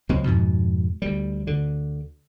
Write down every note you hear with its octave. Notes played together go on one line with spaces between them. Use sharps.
C#2 F#3 G#3 C4
F2 G#2 B2
D2 G3
D2 D3